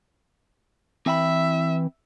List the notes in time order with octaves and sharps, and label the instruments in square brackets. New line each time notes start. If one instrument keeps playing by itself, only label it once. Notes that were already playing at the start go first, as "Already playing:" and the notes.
[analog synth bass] E3 [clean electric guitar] C4 G5 B5 [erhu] E5